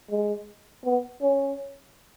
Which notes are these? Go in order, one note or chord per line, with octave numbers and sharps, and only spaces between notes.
G#3
B3
C#4